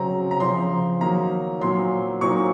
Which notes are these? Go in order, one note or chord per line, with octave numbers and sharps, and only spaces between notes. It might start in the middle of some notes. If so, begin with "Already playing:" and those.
Already playing: C#3 F#3 C4 A#5
A#5
C#3 F3 C4 C6
D#3 F#3 A#3 D#4 A#5
A#2 F#3 C4 C6
A#2 F#3 C4 D#4 C#6